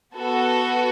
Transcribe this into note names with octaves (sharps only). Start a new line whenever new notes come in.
B3 F#4 A4